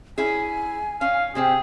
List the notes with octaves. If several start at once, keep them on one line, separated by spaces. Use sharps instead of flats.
C#4 E4 G#4 G#5
C#4 F5
C3 C4 G4 G#4 E5